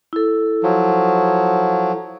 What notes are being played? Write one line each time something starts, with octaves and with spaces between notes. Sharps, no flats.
E4 A4
F3 F#3